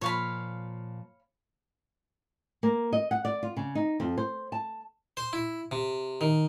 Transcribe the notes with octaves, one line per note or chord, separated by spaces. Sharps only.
A#2 F3 C#5 F5 B5
A#3
D#5
F#5
D5
F4
C#3
D#4
F2
C5
A5
C5
E4
C3
D#3